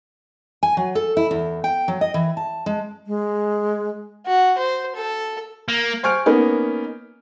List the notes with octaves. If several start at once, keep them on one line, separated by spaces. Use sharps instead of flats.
G#5
F#3
A4
E4
E2
G5
F#3
D#5
E3
A5
G#3
G#3
F#4
C5
A4
A#3
C5 G#5 C#6 F6 D7
A#3 B3 C#4 D#4